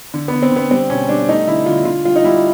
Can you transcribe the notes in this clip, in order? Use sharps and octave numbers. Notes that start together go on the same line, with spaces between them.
D3
B3
D3
C4
D3 B3
G3 C4
B2 C#4
G3 D4
A3 D#4
D3 E4
D3 F4
D3 F4
G3 F4
D#4
G3 E4